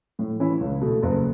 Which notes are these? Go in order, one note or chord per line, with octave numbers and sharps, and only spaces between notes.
A2
E3 C#4 E4
C#2
B2 A3
F#1